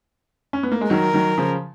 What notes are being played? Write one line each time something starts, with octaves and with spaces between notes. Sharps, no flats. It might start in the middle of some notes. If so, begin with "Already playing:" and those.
C#4
B3
A#3
G#3
D#3 F#3 A#4
D#3 F#3
C#3 F3